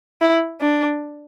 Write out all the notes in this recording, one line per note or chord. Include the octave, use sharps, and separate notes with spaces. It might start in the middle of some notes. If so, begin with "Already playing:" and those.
E4
D4